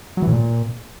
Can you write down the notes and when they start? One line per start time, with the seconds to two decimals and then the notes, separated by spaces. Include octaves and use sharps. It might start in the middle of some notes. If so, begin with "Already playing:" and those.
0.17 F#3
0.22 E3
0.27 A2
0.33 A#2